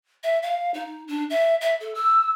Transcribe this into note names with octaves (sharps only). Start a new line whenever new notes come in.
E5
F5
D#4
D4
E5
E5
A4
E6